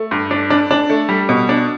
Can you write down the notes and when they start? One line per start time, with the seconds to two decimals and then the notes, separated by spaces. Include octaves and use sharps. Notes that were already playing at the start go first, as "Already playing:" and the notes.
Already playing: A3
0.11 G2
0.31 D4
0.50 D4
0.71 D4
0.90 A3
1.09 G3
1.29 B2
1.49 D4